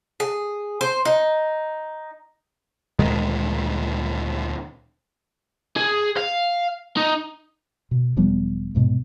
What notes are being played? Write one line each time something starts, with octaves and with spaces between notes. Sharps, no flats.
G#4
C5
D#4
D2 A#2 D#3 G#3
G#4
F5
D#4
B2
E1 F3 G3 B3
C2 G#2 B2